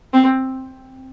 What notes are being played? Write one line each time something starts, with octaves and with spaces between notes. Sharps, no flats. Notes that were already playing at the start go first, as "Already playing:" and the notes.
C4